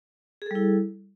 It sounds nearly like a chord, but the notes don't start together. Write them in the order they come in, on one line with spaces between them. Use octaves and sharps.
G#4 A4 G3 E4